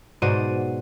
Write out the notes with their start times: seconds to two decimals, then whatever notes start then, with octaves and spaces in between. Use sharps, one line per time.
0.22 G#2 B2 F#4 C5 D5 D#7